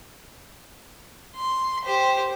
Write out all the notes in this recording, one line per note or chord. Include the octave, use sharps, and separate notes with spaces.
C6
G4 C5